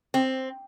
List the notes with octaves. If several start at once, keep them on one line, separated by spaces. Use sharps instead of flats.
C4